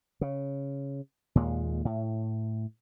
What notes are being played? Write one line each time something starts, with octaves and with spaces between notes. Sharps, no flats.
C#3
D#2 A#2 G#3
A2